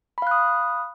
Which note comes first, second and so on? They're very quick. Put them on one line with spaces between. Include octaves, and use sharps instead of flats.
B5 F5 F#6 D#6